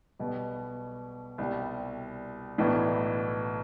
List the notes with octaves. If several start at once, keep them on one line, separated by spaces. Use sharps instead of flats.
B1 B2 G3 B3
C2 B2 G3
B1 A2 E3 B3 D4